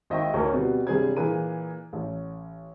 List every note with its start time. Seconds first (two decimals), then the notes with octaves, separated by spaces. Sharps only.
0.10 G#1 D#5 E5 G5 C#6
0.34 D2 A#4 C#5
0.53 B2 G3 B3 C4
0.87 G1 C3 G3 G#4 C5 G#6
1.16 A#2 E3 G#4 B4 D#7
1.93 A1